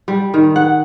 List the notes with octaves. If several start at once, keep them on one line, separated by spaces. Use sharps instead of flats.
G3
D#3
F#5